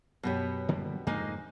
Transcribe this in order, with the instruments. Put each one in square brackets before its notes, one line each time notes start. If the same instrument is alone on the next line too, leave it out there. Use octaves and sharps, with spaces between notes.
[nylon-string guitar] F#2 C#5 [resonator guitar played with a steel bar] B2 B3 G4
[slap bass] D3 G3 A#3
[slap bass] F2 G#2 D3 [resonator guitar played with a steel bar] G#3 A#3 D#4 [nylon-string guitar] G#5